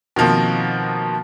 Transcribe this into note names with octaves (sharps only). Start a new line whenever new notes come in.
B2 D#3 F3 A#3 C4